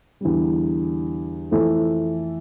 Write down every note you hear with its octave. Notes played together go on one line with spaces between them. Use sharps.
E2 D3 G3
F2 E3 A3 E4 A4